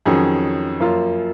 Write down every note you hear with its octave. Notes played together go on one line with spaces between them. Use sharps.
F2 D#3 F#3 C#4 G#4
F#2 F3 A#3 F4